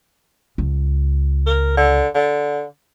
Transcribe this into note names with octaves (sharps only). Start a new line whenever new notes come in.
C#2
A#4
D3
D3